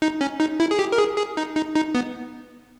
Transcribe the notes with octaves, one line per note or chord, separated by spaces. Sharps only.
D#4
C#4
D#4
E4
G#4
G4
A#4
G#4
G#4
D#4
D#4
D#4
B3